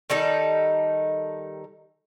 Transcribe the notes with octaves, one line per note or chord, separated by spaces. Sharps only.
D#3 G3 D#4 A4